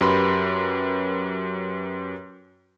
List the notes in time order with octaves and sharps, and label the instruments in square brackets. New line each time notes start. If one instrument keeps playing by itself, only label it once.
[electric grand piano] F#2 G4 A#4 B4 B5 C6